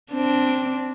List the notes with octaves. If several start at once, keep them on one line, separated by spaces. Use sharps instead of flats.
C4 D4